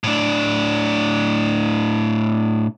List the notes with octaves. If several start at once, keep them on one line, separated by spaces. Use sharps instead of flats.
A2 D4